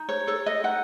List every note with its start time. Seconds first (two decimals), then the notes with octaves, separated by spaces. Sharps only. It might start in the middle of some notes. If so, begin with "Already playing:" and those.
Already playing: D#4
0.09 C#5
0.27 A4 C#5
0.46 D#5
0.64 D#4 F#5